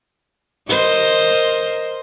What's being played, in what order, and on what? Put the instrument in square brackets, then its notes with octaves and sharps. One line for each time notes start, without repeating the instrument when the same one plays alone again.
[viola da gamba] A#4 C5 D#5